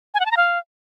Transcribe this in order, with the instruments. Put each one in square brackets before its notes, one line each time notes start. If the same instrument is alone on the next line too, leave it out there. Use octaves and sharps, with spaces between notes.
[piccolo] G#5
F#5
A5
A#5
F5